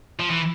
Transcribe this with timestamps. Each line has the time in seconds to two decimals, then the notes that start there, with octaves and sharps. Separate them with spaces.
0.19 F3
0.30 E3